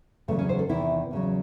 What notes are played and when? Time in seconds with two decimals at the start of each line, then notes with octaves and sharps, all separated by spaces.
0.28 E2 C#3 F#3 A3
0.39 C#4
0.49 C5
0.59 A4
0.69 E2 C3 D#3 E4
1.11 E2 C#3 F#3